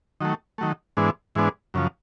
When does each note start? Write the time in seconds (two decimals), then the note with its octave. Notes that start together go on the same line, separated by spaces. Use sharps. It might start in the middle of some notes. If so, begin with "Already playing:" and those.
0.21 D#3 F#3 A3
0.58 D#3 F#3 A3
0.97 G#2 E3 G#3 B3 D4
1.35 G#2 E3 G#3 B3 D4
1.74 F#2 C#3 F3